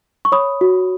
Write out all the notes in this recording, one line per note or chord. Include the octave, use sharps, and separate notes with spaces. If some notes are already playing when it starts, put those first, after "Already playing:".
C#6
C#5 B5 D#6
F#4